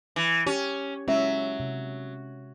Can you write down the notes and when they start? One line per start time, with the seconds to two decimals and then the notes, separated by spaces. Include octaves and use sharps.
0.16 E3
0.47 C#4 G4
1.08 F#3 G#3 C#4 E5
1.59 C3